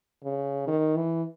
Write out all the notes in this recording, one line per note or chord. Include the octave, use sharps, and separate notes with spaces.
C#3
D#3
E3